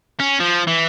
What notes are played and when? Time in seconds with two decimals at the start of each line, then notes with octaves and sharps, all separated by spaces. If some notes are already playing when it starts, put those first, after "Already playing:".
0.20 C#4
0.40 F3
0.67 E3